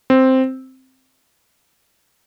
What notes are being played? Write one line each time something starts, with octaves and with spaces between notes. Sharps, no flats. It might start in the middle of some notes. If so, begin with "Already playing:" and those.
C4